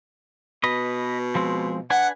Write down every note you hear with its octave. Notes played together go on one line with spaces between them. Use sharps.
B2 B4 D#5
F3 G#3 C4
D4 B4 F#5 G#5